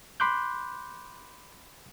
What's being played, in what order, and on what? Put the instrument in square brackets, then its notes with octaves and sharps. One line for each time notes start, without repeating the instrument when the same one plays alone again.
[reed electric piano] B5 C6 D6 F#6 G6